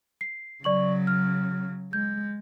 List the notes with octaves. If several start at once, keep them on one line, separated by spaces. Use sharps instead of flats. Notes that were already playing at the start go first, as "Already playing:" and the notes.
C7
C#3 F#3 D5 C#6 F#7
F6
G#3 G6